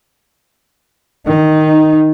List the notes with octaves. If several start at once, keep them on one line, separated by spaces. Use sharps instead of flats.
D#3 D#4